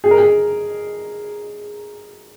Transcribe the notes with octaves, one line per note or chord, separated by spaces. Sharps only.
G#4
A#4
G#4